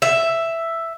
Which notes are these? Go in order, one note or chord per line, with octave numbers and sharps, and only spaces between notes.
E5